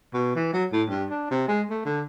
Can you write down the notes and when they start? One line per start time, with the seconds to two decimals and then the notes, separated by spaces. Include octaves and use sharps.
0.13 B2
0.35 E3
0.53 F#3
0.72 A2
0.89 G2
1.10 D4
1.31 C3
1.48 G#3
1.70 A3
1.85 D3